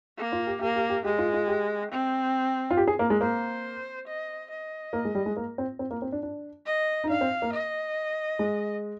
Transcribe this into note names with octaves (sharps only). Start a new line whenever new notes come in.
A#3
F4
G4
A#3 G4
G4
G4
G#3 G4
F4
F4
G4
C4
F4
G4
G#4
A#3
G#3
A#3 C5
D#5
D#5
A#3
G#3
G3
G#3
A#3
C4
C4
A#3
C4
D4
D4
D#5
D#4
D4 F5
C4
A#3
D#5
G#3